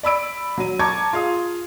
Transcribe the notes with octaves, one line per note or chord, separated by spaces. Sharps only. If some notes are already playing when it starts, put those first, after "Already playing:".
D5 B5 E6 D7
F#3 D#7
A5 A#5 C#6 D6 G#6
F4 G#4 F5 D#6